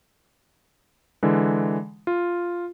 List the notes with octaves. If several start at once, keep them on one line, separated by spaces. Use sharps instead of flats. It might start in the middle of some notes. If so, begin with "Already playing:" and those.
D3 E3 G#3
F4